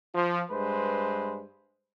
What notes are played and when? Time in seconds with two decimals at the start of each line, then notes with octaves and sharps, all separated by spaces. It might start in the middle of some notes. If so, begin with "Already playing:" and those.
0.15 F3
0.50 G2 G#3 B4 C5